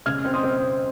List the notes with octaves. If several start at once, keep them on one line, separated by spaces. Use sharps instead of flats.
C#3 F6 G#6
C4
C6 D#6
C4